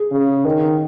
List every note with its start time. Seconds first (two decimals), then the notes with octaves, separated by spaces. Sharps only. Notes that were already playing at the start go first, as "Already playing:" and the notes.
Already playing: G#4
0.11 C#3
0.45 D#3 A#4